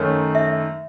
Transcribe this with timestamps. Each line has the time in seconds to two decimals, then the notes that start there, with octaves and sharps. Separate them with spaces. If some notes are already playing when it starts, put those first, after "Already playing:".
Already playing: F#2 D#3 A3 D#4 C#5
0.35 E5